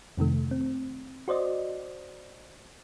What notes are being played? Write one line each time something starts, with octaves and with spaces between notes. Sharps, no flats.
F2 C3 D#3 A3
C4
F#4 C5 D5 D#5